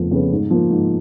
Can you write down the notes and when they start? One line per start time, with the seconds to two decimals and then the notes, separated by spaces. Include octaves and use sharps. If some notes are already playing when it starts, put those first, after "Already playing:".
Already playing: F1 F2 C#3 F3 B3
0.11 F2 C#3 F3 B3
0.32 G#2
0.50 F3 A#3
0.70 G#2